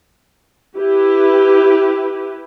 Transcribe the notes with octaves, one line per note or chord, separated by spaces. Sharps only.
E4 G4 B4